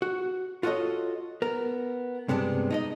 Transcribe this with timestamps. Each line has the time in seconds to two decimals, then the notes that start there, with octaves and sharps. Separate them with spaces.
0.02 F#4
0.63 F4 F#4 A4 C#5 D#5
1.42 B3 A#4
2.28 G2 C3 G#3 B3 D4
2.70 D#4 G#4 D#5